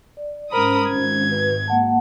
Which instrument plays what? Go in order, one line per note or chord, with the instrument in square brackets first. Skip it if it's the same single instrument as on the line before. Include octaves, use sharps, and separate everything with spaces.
[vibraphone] D5
[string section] G#2 D#6 [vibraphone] C#4 C5 [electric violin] A#4 B5
[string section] G#1 [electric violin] G#6
[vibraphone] B4
A#3 F#5 A5